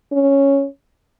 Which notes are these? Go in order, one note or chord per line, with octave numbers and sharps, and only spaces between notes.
C#4